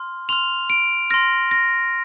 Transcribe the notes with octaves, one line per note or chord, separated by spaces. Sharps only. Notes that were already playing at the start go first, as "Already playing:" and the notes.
Already playing: C6 F6
C6 F6 F7
D7
C6 F6 A#6
A#6